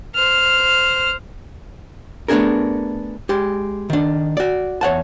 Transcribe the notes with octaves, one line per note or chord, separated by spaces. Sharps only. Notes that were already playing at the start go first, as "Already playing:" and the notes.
C5 F6
A3 B3 D4 G#4 A#4
G#3 G4
D#3 D4
F#4 D5
E2 C#5 F#5 A5